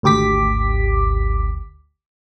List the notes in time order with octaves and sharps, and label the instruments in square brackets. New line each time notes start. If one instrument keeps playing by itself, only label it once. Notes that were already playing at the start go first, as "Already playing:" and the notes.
[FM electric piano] G#1 D2 G4 D6 B6